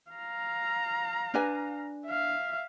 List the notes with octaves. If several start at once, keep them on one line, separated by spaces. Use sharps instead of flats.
F5 A#5
D4 B4 G#5
E5 F5